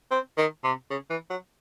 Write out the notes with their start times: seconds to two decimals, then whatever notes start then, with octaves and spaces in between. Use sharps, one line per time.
0.11 C4
0.37 D#3
0.64 C3
0.90 C#3
1.10 E3
1.30 F#3